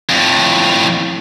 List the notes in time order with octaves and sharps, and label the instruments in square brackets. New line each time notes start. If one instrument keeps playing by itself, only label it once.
[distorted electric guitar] F2 A2